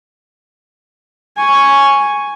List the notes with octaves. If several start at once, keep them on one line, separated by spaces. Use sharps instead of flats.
G#5 C#6